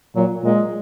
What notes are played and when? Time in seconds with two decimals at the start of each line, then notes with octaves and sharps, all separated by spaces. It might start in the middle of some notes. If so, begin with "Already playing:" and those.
0.15 A#2 F#3
0.43 A#2 G#3